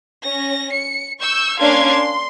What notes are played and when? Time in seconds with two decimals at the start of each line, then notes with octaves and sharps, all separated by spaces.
0.24 C#4 A#6
0.73 C#7
1.20 C#6 E6 G6
1.59 A#3 C#4 D4 F5 C6 G#6
1.89 C6